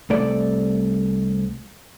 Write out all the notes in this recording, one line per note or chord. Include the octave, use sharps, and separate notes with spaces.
C2 A3 D5